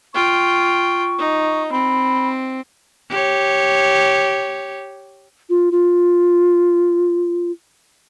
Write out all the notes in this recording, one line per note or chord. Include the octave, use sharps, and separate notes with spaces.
F4 G5 C#6
D#4
C4 B5
G4 C#5
F4
F4